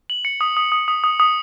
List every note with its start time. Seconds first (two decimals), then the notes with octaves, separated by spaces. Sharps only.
0.10 F#7
0.25 C#7
0.41 D#6
0.57 D#6
0.72 D#6
0.88 D#6
1.04 D#6
1.20 D#6